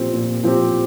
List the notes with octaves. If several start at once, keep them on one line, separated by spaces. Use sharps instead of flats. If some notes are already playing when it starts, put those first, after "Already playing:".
Already playing: A#2 F3 C4 G4
A#2
F3 C4 G4